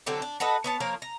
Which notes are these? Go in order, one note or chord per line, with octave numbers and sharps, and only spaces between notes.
D3 F#3 C4 G4
D4
F#4 A4 B4 D#5
B3 C#5 A5
F3 A#3 A#4 C#5
A#5